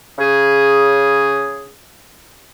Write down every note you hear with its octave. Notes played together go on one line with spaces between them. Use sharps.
C#3 G#4